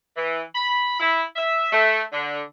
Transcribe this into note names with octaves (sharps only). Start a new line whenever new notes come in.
E3
B5
E4
E5
A3
D3